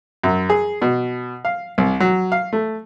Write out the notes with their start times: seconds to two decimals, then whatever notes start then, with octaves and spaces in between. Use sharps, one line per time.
0.24 F#2
0.50 G#4
0.82 B2
1.45 F5
1.78 C2
2.00 F#3
2.32 F5
2.53 A3